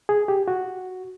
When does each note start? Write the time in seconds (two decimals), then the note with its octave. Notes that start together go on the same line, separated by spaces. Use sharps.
0.09 G#4
0.28 G4
0.48 F#4